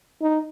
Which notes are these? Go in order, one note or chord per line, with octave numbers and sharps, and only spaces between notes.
D#4